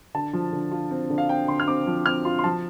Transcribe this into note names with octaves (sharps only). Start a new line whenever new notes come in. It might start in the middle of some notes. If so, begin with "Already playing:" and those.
D3 A5
F3
D3
F4
C4
D3
F5
C4 G5
D3 C6
F6
C4 D6
F3
C4 F6
F4 C6
C6
F3 A5